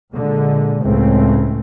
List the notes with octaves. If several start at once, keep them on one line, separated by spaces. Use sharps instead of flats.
A#2 D3 G#3
C#2 A2 C#3 A3 C4